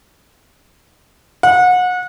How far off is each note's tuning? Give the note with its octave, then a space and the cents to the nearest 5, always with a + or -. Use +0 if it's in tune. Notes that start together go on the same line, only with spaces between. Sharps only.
F#5 -30